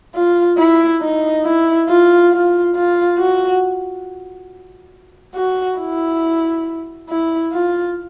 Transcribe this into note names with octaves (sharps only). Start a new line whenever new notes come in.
F4
E4
D#4
E4
F4
F4
F4
F#4
F#4
E4
E4
F4